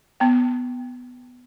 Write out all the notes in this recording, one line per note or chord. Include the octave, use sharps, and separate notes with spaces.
B3 G5